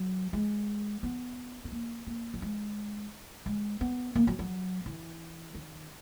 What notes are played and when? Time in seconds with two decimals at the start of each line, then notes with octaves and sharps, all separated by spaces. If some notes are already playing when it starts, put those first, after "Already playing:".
Already playing: F#3
0.33 G#3
1.03 B3
1.64 B3
1.72 A#3
2.07 A#3
2.34 F#3
2.42 G#3
3.46 G#3
3.81 B3
4.15 A#3
4.27 F#3
4.39 F#3
4.86 E3
5.55 D#3